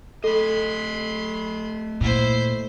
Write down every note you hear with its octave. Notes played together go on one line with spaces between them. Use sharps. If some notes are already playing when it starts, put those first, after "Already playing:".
A3 A4 D#5 B5 C6
A#2 E4 C5